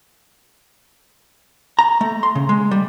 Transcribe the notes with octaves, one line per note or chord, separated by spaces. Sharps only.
A#5
A3
C6
C#3
G#3
G3